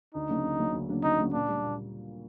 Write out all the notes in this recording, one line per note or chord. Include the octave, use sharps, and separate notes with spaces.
D2 D#4
C#3 F#3 A#3 D4
D2
C#3 F#3 A#3 D4
D2
C#3 F#3 A#3 D4
D2 D#4
C#3 F#3 A#3 D4
A#2 D4
G3 A#3
A#2